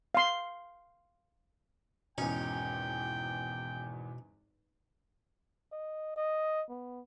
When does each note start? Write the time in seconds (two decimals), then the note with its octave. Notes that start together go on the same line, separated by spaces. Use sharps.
0.15 F5 C6
2.18 G#1 E2 B2 C#4 D#4 G5
5.72 D#5
6.17 D#5
6.70 B3